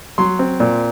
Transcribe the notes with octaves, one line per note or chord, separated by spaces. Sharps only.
F#3 C6
C4
A#2